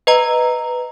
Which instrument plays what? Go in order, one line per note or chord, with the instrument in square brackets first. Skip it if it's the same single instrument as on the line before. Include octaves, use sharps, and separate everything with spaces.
[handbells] B4 D#5 A#5